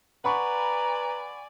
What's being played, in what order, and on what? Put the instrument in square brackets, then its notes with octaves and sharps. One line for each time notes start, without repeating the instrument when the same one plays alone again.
[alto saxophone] B4 [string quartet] D5 G#5 [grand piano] F#5 B5 C#6 [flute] A#5